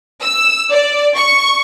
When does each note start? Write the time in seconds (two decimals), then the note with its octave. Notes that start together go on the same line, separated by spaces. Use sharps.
0.23 E6
0.72 D5
1.15 C#6